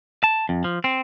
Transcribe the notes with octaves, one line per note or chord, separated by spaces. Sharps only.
A5
F2
F3
C4